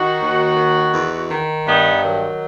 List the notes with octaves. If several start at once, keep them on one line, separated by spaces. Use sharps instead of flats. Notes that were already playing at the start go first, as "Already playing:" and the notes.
Already playing: D#3 D#4 F#4
D#2
D#3
E2
D#3
G2 B3 D#4
D#3 F#3